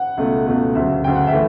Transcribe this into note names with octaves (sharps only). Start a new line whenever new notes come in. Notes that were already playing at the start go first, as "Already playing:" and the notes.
Already playing: F#5
C#2 B2 A3
C#2 B2 A3
D2 C#3 F#3 E5
D2 C#3 F#3 G5
F#5
E5
E3 A3